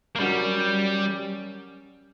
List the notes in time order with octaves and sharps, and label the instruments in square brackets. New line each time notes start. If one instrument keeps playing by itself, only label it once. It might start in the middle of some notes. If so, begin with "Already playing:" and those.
[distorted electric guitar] A#3
[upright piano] F#3 C#4 F#4 A#4 [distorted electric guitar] G3